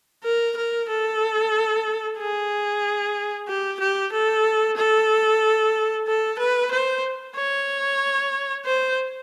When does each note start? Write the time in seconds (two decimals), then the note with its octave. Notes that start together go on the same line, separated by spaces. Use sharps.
0.24 A#4
0.56 A#4
0.89 A4
2.18 G#4
3.48 G4
3.80 G4
4.12 A4
4.77 A4
6.07 A4
6.38 B4
6.71 C5
7.36 C#5
8.65 C5